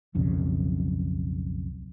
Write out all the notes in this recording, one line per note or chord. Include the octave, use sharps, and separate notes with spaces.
D1 B1 F2 C#3